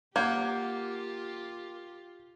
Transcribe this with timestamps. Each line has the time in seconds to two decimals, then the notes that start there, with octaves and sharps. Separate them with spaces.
0.16 A#3 F4 G4 F#5 G6 G#6